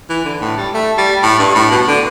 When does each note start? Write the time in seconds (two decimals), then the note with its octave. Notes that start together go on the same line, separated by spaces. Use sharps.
0.09 E3
0.25 D3
0.41 A2
0.57 G3
0.74 A3
0.98 G3
1.23 A2
1.39 G2
1.55 A2
1.71 B2
1.87 D3